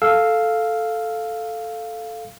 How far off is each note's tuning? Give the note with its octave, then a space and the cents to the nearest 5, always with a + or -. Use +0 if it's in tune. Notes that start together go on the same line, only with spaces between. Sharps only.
A4 +0 F5 +0 E6 +0